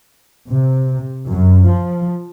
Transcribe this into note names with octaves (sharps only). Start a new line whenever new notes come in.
C3
F#2
F3